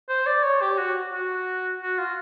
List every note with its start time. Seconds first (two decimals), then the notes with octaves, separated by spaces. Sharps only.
0.09 C5
0.26 D5
0.44 C#5
0.62 G4
0.78 F#4
1.13 F#4
1.82 F#4
1.99 F4